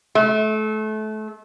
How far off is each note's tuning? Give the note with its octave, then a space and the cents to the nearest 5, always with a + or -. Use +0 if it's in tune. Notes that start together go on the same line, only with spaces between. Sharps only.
A3 -30